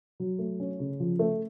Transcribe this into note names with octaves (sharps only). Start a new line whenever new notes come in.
F#3
A3
C#4
C#3
F3
A3